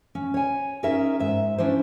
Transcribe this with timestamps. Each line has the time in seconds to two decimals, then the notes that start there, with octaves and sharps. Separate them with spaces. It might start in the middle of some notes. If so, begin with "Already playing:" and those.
0.15 C#4
0.34 C#5 G#5
0.83 C#4 D#4 G#4 A#4 E5
1.20 G#2 E5
1.58 C#4 D4 E4 C5